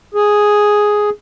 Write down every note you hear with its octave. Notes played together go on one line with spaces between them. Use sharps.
G#4